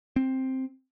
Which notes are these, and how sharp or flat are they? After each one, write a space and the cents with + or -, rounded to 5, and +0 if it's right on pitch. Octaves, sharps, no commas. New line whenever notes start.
C4 +5